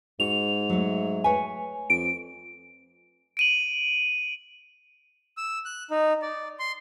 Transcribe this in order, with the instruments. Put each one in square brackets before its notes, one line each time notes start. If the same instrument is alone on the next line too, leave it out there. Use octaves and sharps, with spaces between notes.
[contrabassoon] G#2 [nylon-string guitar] F#4 [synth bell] F7
[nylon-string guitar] F#3 A3
[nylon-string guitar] B4 C#5 [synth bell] G#5
[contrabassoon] F2 [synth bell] D7
[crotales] D7 D#7 F#7
[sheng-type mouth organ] E6
F#6
D#4
D5
C6